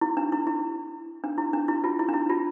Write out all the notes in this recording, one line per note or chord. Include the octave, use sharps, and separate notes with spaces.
E4
D4
E4
E4
D4
E4
D4
E4
F4
E4
D4
E4
F4